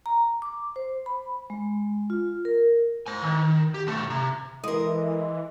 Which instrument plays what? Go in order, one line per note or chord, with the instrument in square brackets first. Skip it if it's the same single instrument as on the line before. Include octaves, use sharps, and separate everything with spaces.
[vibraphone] A#5
D6
C5
B5
G#3
F4
A#4
[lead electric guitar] C5 G#5
D#3
G4
B1 A3
C3
[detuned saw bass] E3 [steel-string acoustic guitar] G#3 A#4 [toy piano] A4 D#6 [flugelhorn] D#5